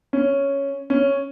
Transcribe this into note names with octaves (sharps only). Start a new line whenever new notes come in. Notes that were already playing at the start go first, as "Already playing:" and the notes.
C#4
C#4